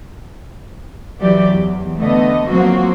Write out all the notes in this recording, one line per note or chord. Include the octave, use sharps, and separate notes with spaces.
E3 F#3 G4 D5
E2
D3 A3 B3 D#5
F3 F#3 A#3 C4 F#4